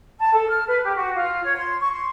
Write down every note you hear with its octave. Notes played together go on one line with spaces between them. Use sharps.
A5
A4
F6
B4
G4
F#4
F4
C#5
C6
C#6
C6